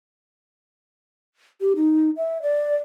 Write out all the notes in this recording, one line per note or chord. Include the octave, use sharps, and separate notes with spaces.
G4
D#4
E5
D5